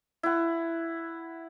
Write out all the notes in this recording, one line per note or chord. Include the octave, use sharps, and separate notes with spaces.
E4 F#5